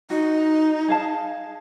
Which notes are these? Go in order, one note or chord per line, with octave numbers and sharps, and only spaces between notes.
D#4 F#4
G#4 F5 A5